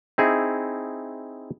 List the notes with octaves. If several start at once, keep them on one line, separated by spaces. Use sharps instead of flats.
C4 D#4 E4 G#4